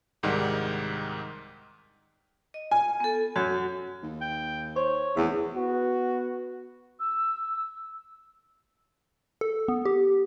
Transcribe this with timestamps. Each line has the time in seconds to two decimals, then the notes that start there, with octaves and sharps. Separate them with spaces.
0.23 C2 G#2 D#3 G3
2.54 D#5
2.71 F4 G#5
3.00 B3 A4
3.36 F#2 F#4
4.03 D#2
4.21 G5
4.76 C5 C#5
5.17 F1 E2 E5
5.56 B3 F#4
7.00 E6
9.41 A4
9.68 B3
9.85 G4